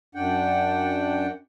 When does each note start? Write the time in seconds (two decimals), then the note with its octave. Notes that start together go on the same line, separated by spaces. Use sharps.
0.15 F#2 D4 F#5 G5